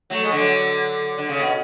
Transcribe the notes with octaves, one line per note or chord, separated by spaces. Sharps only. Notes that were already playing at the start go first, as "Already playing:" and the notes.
F#3 A3
G#3
D3 F#3
D3
C#3
B2